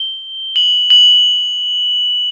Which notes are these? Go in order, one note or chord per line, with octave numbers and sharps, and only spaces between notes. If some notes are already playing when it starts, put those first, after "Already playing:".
Already playing: G7
F#7
F#7